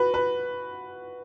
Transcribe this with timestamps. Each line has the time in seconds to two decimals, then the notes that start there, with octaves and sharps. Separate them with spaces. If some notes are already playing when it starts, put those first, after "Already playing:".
Already playing: F#4 B4
0.14 B4